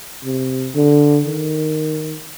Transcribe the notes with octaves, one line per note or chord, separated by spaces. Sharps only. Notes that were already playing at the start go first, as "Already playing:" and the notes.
C3
D3
D#3